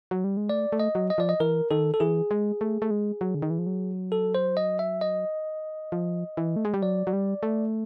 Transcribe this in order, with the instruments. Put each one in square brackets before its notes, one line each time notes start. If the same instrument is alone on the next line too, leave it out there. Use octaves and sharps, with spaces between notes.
[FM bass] F#3
G3
G#3
[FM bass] A3 [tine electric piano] D5
[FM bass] A3
[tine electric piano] D#5
[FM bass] F#3
[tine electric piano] D#5
[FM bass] F3 [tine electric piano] D5
[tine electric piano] D#5
[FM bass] E3 [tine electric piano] A#4
[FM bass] D#3 [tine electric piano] A4
[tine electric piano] A4
[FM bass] E3 [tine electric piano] G#4
[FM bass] G#3
A3
A3
G#3
F#3
D3
D#3
E3
F3
F#3
[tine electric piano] A4
C5
D#5
E5
D#5
[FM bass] F3
E3
A3
G#3
G3
[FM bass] F#3 [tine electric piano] D5
[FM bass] F#3
G3
A3